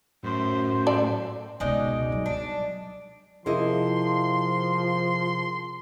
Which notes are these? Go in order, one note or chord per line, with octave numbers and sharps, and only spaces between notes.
F#2 A2 C5
A4 D5
C#2 B2 G#3 D#4 D5
F#3 G3
D4
C3 F3 E4 G#4 A#4 D#5 C6